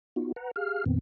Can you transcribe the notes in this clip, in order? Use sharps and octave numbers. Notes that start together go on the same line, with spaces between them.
B3 D#4 F4 F#4
B4 F#5 A#5
G4 G#4 F5 F6
F2 A#2 D#3 B3 C4